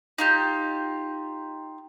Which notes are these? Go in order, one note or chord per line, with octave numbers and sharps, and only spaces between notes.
D#4 F4 G4